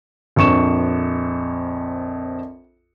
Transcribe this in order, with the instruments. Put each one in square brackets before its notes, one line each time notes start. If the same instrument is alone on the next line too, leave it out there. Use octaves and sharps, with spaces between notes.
[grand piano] A#1 F2 C#6 E7